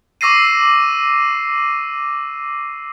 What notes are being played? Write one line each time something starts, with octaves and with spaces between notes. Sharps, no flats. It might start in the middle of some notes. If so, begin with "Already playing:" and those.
C#6 D6 E6 A#6 C7 D#7